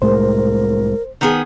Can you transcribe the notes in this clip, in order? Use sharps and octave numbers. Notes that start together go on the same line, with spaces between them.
C2 A2 G#3 A#4 C5
D#3 B3 G#4